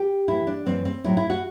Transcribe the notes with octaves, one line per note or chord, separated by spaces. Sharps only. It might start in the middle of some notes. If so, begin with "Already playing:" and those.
Already playing: G4
A2 E3 E4
D4
F#2 E3 C4
C4
A2 F#3 E4
E4
F#4